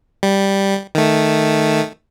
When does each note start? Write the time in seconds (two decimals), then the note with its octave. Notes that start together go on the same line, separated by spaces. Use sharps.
0.23 G3
0.95 D#3 A3